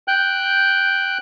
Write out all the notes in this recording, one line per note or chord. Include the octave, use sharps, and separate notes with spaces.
G5 F#6 G6